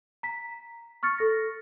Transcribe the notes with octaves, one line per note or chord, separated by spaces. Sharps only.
A#5 B6
C#6 F6 A6 C#7
A4 A#6